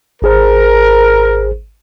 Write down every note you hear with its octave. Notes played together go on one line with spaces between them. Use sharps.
G#1 G#4 A#4 C5